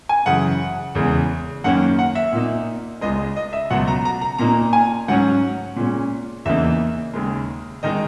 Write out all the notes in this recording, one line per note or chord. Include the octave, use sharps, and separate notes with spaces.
G#5
F#2 C#3 E3 F#5
E2 C#3 G#3
F#2 D#3 A#3 C#4 F#5
F#5
E5
A#2 A#3 D#4
C#2 C#3 G#3 D#5
D#5
E5
C#2 B2 F#3 F#5
A#5
A#5
A#5
A#2 A#3 D#4 A#5
G#5
G#2 F#3 C#4 F#5
A#2 G#3 C#4
E2 C#3 E3 A#3 D#4 E5
D#2 C#3 G#3
D#3 G#3 D#4 D#5